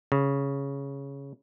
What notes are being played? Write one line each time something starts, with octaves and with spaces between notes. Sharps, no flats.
C#3